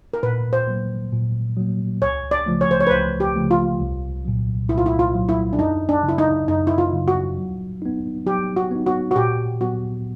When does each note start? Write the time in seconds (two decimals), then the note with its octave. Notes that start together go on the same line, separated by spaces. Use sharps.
0.13 A#4
0.23 A#2 B4
0.53 C5
0.67 F#3 A#3
1.12 A#2
1.57 F#3 A#3
2.02 C#2 C#5
2.31 D5
2.46 C#3 F3 A3
2.61 C#5
2.71 C5
2.80 C#5
2.87 B4
2.91 C#2 C5
3.20 G4
3.36 C#3 F3 A3
3.51 F4
3.80 C2
4.25 A#2 F#3
4.69 C2 E4
4.78 F4
4.86 E4
4.99 F4
5.14 A#2 F#3
5.29 E4
5.53 D4
5.58 F#2 D#4
5.89 D4
6.03 C#3 F#3
6.09 E4
6.18 D#4
6.48 F#2 D#4
6.67 E4
6.78 F4
6.93 C#3 F#3
7.08 F#4
7.37 F#3
7.82 B3 D#4
8.26 F#3 G4
8.56 F#4
8.71 B3 D#4
8.86 F#4
9.11 F#4
9.16 A#2 G4
9.61 F#3 B3 F#4